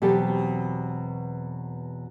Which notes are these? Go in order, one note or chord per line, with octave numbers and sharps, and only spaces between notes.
E2 B2 F#3 C4 G4 A4